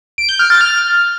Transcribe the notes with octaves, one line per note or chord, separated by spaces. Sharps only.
D7
G6
F6
A6
F6